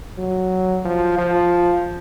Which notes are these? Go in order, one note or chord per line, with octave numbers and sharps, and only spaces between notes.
F#3
F3
F3